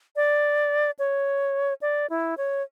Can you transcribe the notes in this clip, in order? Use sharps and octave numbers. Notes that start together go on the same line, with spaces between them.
D5
C#5
D5
E4
C#5